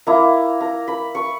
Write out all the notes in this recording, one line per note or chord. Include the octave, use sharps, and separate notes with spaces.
A#3 E4 A#5
A#5
B5
C#6